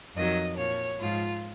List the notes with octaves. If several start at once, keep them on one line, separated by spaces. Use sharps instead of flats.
F2 D#3 F#3 D#5
A#2 F3 C#5
G#2 F3 F4